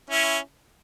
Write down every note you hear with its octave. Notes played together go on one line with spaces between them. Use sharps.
C#4 E4